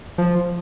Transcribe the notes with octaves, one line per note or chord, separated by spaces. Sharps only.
F3